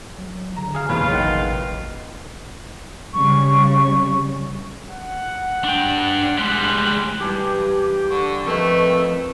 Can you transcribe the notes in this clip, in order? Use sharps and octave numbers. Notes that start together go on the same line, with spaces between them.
F#3
D3 A#5
G#4 F5
F#1 B1 E2 C3 F4 B4 C#5
A1 D#3 F#5
C#3 G3 C#6
F#5
D4 G5
G3 G#3 F#6
E3 G3 G4 A5 D6
D3 C#6
F2 A3 A#4 B4 D#5